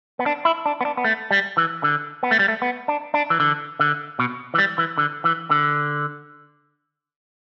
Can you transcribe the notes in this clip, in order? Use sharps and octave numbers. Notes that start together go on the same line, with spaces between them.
B3
D4
E4
D4
B3
D4
B3
A3
G3
E3
D3
B3
A3
G3
A3
B3
D4
D4
E3
D3
D3
B2
E3
G3
E3
D3
E3
D3